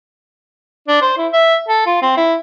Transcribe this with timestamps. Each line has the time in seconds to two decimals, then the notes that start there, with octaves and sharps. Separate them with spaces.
0.88 D4
1.02 C5
1.17 E4
1.33 E5
1.68 A4
1.86 F4
2.02 C4
2.17 E4